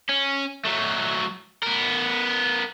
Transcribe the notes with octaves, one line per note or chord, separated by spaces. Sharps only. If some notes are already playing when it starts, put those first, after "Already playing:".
C#4
F#3 A3
B3 A#4